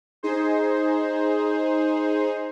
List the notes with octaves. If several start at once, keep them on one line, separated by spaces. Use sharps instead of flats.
D#4 G#4 C5